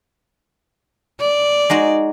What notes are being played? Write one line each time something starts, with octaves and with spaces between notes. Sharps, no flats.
D5
G#3 D#4 F#4